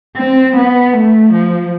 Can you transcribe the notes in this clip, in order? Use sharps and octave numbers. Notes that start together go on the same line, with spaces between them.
C4
B3
A3
F3